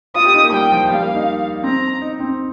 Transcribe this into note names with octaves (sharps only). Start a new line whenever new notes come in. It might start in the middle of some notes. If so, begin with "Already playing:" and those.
F4 D#6
G4
D#4
A#3
G3 G5
F3
G3 F5
A#3
D#4
C4 A#5
D#4
C4